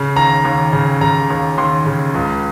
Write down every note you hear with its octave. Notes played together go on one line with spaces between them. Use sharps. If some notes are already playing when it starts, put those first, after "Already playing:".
Already playing: C#3
D#2 A#5
D#2
C#3
C#3 A#5
D#2
D#2 C6
C#3
C#2